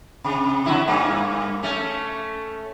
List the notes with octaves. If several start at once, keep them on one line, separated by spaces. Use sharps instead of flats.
C3
D3 F#3 E4
G2 A#3
A3 C#4